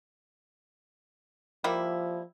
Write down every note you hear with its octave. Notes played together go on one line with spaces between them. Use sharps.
F3 G3 A#3 E4